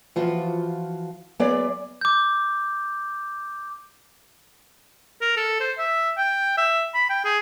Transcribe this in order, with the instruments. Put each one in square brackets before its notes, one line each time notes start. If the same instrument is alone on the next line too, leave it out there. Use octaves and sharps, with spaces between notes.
[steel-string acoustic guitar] E3 F3 F4 F#4
F#3 B3 G#4 D5 E5
[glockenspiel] D6 G6
[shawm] A#4
A4
C5
E5
G5
E5
B5
G5
G#4